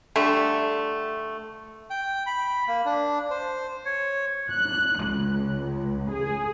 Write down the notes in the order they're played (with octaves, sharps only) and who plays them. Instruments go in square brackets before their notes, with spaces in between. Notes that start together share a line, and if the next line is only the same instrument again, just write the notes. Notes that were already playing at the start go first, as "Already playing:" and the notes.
[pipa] D3 G3 A3
[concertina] G5
B5
A#3
D4
C5
C#5
[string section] F#6
C#2
G#4